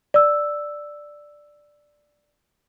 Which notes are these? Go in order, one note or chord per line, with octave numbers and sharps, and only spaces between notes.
D5 E6